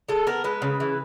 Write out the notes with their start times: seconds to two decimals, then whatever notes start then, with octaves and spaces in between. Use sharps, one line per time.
0.09 G#3 A4
0.27 B3 A#4
0.44 G#3 B4
0.62 C#3
0.80 E3